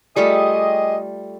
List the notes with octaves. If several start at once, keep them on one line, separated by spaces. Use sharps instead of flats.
G3 A3 F4 G4 G#4 D#5